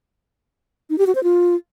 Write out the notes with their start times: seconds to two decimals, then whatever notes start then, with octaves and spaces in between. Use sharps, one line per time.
0.90 D#4
0.98 G4
1.07 F#4
1.15 C5
1.23 F4